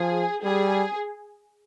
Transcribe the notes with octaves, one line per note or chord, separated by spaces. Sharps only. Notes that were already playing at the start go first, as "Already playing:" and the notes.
Already playing: F3 G#4
G3 G#4